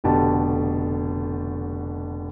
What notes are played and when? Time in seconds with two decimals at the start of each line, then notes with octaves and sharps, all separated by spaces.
0.04 F1 B2 D3 G4 A5